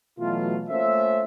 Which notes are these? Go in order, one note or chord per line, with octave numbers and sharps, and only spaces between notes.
B2 E3 F#3 A3 F4
A3 A#3 C#4 F4 C5 E5